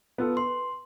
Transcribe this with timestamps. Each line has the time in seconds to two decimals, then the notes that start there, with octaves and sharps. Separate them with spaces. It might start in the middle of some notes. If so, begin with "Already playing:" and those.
0.18 B3 F4 A4
0.37 B4 C6